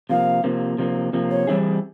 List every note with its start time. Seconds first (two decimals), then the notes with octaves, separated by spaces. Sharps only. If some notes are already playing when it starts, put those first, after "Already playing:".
0.09 C3 F3 A#3 F5
0.44 C3 F3 A#3
0.78 C3 F3 A#3
1.13 C3 F3 A#3
1.30 C#5
1.47 E3 G3 C4 E4 G#4